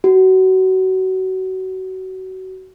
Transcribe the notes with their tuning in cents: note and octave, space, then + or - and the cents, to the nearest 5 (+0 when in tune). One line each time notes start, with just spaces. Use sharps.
F#4 +25